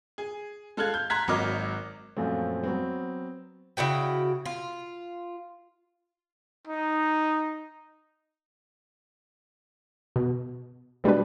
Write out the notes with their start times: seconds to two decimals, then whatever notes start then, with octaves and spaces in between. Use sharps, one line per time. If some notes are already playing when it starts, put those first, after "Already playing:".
0.18 G#4
0.77 G#3 A4 F5 F6 F#6 G#6
0.94 G6
1.10 A#5 C6 F#6 G#6 B6
1.28 G#1 F#3 A#3 D#5 D6 F6
2.17 F#2 A#2 F3 F#3 A3 C4
2.64 F#3 B3 C4
3.77 C#3 E4 F#4 G5
4.46 F4
6.67 D#4
10.16 B2
11.04 B2 G3 G#3 D4 B4